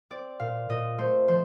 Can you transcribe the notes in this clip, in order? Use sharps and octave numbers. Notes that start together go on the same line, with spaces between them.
C4 D5
A#2 F5
A#2 D#5
A3 C5
F3 C5